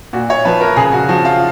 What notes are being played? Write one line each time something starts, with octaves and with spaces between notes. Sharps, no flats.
A#2 F#4
C#5
F3 B4
A#4
C#3 G#4
F#4
F3 F#4
F4